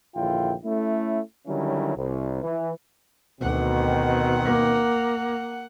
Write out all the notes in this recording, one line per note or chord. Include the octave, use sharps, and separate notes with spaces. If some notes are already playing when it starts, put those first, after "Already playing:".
A#1 D#2 D3 E4 F4 G5
A3 C#4 E4
D3 D#3 F#3 G3 C#4 E4
C2
E3
D2 B2 D#3 C4 F#5
A#3